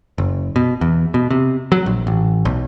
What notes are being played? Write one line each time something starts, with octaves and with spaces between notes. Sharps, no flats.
F#1
B2
E2
B2
C3
F#3
A#1
A1
B1